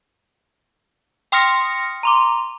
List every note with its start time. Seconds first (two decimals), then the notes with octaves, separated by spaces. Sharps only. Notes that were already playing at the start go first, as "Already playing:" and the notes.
1.32 G5 C6 D#6 F6 A#6 C#7
2.03 A#5 C6 D6